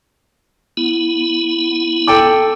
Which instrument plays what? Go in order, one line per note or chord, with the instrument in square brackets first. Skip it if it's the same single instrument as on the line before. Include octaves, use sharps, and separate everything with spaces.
[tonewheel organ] B3 E4
[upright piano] A4 G5 D6